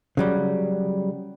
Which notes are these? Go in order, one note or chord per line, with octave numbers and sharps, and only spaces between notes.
C#3 F#3 G3